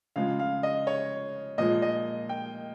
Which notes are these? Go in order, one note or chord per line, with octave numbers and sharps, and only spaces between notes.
C#3 F3 G#3 F5
F5
D#5
C#5
A#2 F3 G#3 D#5
D#5
G5